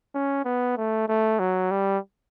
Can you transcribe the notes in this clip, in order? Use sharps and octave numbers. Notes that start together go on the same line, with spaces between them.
C#4
B3
A3
A3
F#3
G3